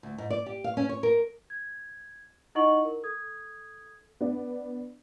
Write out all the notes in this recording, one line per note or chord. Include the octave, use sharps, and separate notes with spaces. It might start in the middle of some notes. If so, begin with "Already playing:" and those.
D2
G#2
D5
G4
F5
C#4
C#5
A#4
G#6
D#4 E4 D#5 F#5 C#6 F#7
A#4
A4 D#6 G#6
B3 D4 D5